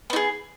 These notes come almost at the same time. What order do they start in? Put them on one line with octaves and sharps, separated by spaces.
B3 D#4 G#4